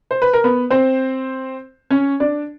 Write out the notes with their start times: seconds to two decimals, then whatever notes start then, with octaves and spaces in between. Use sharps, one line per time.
0.11 C5
0.22 B4
0.34 A#4
0.44 B3 B4
0.70 C4 C5
1.90 C#4 C#5
2.20 D4 D5